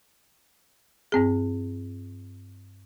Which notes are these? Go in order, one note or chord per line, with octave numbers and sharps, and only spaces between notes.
G2 C4 G#4